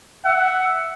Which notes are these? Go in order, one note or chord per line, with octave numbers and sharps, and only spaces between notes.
E5 F#5